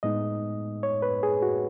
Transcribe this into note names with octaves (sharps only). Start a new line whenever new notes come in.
A2 G#3 B3 D#4 D#5
C#5
B4
G#4
F#4